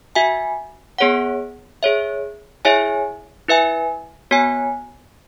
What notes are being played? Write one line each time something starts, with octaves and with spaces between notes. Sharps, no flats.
F#4 E5 G#5
B3 G#4 C#5 F#5
G#4 C#5 E5
E4 G#4 C#5 E5 G#5
E4 B4 E5 G#5
B3 F#4 C#5 G#5